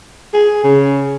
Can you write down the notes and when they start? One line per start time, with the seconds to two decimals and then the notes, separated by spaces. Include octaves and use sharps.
0.34 G#4
0.64 C#3